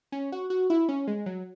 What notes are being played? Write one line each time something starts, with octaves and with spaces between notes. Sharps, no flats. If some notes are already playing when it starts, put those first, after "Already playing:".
C#4
F#4
F#4
E4
C#4
G#3
F#3